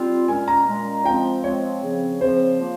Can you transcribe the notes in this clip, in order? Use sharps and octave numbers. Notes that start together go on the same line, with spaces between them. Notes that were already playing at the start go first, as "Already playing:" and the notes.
Already playing: G3 C4 F4
A#2 G#3 C#4 G#5
A#5
A#2 G#3 C#4
F3 G#3 C4 G5
F3 G#3 C4 C#5
C#3 F3 C4
C#3 F3 C4 C5
F3 A#3